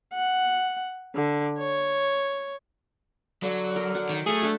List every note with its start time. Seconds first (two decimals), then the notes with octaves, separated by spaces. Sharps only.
0.14 F#5
1.15 D3
1.59 C#5
3.43 D3 F#3
3.76 A#4
3.95 F#3 F#4
4.10 D#3
4.26 A3 G#4 C#5 G#5
4.42 D4 A4 E5